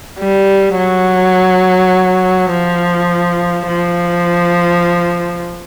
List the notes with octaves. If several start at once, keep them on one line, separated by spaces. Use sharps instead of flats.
G3
F#3
F3
F3